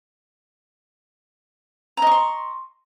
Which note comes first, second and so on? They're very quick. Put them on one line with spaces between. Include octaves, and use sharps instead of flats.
A#5 D#5 C#6 C6